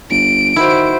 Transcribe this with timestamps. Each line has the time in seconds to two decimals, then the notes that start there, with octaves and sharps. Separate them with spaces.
0.10 G1 D7
0.56 D#3 E4 F#4 C5